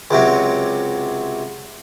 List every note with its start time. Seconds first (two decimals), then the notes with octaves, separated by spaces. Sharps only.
0.11 C#2 C3 F#3